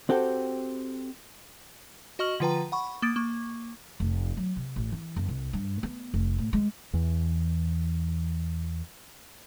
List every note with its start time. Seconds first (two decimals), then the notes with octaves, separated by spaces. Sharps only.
0.09 C4 F#4 G4 A4 G5
2.19 F#4 D#5 C#6 F6 F#7
2.40 D3 F3 F4 B4 G5 A#5
2.72 F#5 B5 C#6
3.02 A#3 D#6 A6 D7
3.16 A#3 C#6
4.00 F1
4.37 F#3
4.56 C3
4.76 A1
4.92 E3
5.16 F#1
5.28 C2
5.53 G2
5.83 B3
6.14 F1
6.38 A2
6.53 G#3
6.93 E2 E3